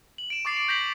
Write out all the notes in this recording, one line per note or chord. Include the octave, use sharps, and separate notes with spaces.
F#7
D7 E7
C#6 D6 A6 C7
C7
G6 A#6 B6 F#7